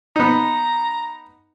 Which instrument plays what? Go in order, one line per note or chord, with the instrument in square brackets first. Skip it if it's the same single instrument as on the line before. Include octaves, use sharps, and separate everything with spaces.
[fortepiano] B3 D#4 [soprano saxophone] A#5